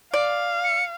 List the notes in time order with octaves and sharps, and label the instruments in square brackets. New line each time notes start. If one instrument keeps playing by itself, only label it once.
[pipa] D5 [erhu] F5
[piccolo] C#7